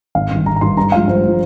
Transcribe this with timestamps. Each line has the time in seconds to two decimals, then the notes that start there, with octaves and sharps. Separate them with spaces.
0.15 G#1 F5
0.30 G2
0.35 D#3
0.46 G#1 A#5
0.56 A#5
0.61 G2 D#3 C6
0.77 G2 A#5
0.92 F3 G#3 F5
1.07 G2 C5
1.23 F3 G#3